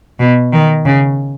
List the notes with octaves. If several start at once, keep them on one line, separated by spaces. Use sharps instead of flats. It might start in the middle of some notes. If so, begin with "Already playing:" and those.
B2
D#3
C#3